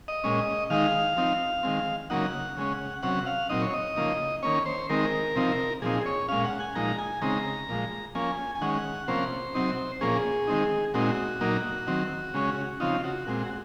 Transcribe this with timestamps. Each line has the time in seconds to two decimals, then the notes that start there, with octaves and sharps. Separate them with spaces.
0.08 D#5
0.24 A#2 G#3 C#4
0.70 D#3 G#3 D#4 F5
1.17 F3 C4 D#4
1.63 D#3 G#3 C4
2.10 C#3 F#3 A#3 D#4 F#5
2.57 C#3 G#3 C#4
3.03 C3 F#3 C#4 F#5
3.26 F5
3.49 A#2 F#3 C4 D#4 D#5
3.62 C#5
3.74 D#5
3.96 C#3 F3 A#3 D#4
4.43 D#3 A#3 C#4 C#5
4.66 C5
4.89 D#3 G#3 C4 D#4 A#4
5.35 C3 F3 C4 D#4
5.82 A#2 F3 C4 D#4 G#4
6.06 C#5
6.29 A#2 G#3 C#4 F5
6.45 F#5
6.60 G#5
6.75 A#2 F3 G#3 D#4 A#5
6.98 G#5
7.22 C#3 G#3 C4 D#4 A#5
7.69 A#2 F3 G#3
8.15 F3 A#3 C#4 G#5
8.55 G#5
8.61 D#3 G#3 C#4 F#5
9.08 C3 F3 A#3 C#4 C5
9.55 C3 F#3 C4 D#4
10.01 A#2 F3 A#3 C#4 G#4
10.47 D#3 G#3 C4 D#4
10.94 A#2 G#3 C4 D#4 F#4
11.41 A#2 F#3 A#3 D#4
11.87 D#3 F#3 C4
12.34 C#3 G#3 C#4
12.80 C#3 F3 C4 D#4 F4
13.04 F#4
13.27 A#2 G#3 C4
13.44 F#4